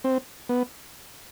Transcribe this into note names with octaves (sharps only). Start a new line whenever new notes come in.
C4
B3